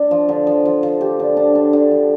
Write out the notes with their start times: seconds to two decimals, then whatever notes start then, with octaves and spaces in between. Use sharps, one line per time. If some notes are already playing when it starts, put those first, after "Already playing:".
Already playing: D4
0.11 F3
0.29 D3
0.47 F3
0.65 F3
0.83 F3
1.01 G4
1.19 D3
1.37 D4
1.55 D4
1.73 D3
1.91 F3